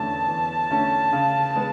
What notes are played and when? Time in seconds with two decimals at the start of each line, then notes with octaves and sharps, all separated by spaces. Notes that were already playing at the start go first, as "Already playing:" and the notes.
Already playing: E2 D3 A3 C#4 A5
0.28 E2
0.71 D3 A3 C#4
1.13 C#3
1.56 G#3 B3